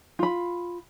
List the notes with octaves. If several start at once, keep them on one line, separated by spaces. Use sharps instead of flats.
F4 B5